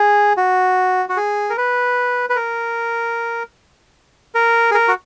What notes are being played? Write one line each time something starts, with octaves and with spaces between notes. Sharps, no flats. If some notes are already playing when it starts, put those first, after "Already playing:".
Already playing: G#4
F#4
F#4
G#4
A#4
B4
B4
A#4
A#4
G#4
A#4
F#4